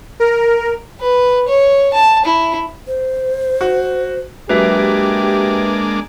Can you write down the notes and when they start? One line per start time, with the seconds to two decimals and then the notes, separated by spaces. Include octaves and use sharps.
0.20 A#4
1.00 B4
1.48 C#5
1.93 A5
2.25 E4
2.87 C5
3.61 F#4
4.49 F#3 G#3 A#3 D4 G4 B4 E5